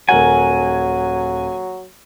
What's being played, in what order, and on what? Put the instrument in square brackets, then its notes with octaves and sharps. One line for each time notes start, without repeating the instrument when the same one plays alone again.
[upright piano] D#1 A#4 F#5 [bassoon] F#3 [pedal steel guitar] G#5